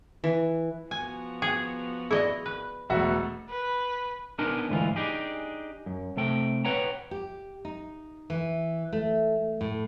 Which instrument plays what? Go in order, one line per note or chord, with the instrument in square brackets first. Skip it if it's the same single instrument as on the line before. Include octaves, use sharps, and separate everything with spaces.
[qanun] E3
[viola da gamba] F3 B3 F#4 [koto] G#5
[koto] G#4 [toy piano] G5
[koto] E4 D#5 [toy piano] G#4 D5
[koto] B4
[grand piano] E1 F#4 E5 [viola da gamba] A3 B3
[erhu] B4
[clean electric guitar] B3 D4 D#4 A#4 G#5
D2 G#2 E3 F4
D4 D#4 G4 G#4
F#2
C3 A3 G5
B4 C#5 F#5 G5 A#5
[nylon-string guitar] G4
D#4
E3
A3
A2